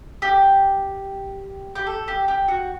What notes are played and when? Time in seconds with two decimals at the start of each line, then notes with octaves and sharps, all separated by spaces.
0.22 G4
1.75 G4
1.87 A4
2.08 G4
2.28 G4
2.48 F#4